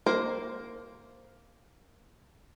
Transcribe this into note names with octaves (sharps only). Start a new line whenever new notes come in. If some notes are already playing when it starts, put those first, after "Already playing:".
A#3 A#4 C5